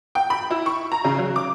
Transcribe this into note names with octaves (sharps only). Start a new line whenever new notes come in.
G5
B5
E4
C#6
A#5
C#3
F#3
D6